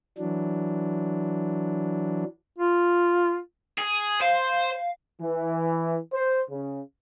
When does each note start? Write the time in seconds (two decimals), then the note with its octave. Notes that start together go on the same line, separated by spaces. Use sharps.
0.18 E3 F#3 D4
2.58 F4
3.78 G#4
4.22 C5 F5
5.21 E3
6.13 C5
6.50 C#3